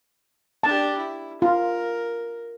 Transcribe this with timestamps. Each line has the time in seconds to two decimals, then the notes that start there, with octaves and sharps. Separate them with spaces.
0.63 D4 G4 A5
0.98 E4
1.42 F4 A#4